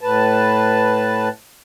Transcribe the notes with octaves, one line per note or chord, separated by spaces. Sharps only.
A2 B4 A5